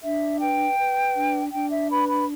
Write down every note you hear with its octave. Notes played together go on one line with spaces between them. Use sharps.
D4 E5
B4 G5
B4
D4
D4 G5
E5
B4 B5
B5